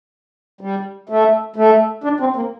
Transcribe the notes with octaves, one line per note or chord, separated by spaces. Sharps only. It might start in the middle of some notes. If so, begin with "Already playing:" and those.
G3
A3
A3
D4
C4
A#3